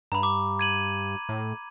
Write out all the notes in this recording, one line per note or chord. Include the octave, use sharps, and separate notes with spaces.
G2 A#5 B5
D6
G#6 D#7 F#7
A2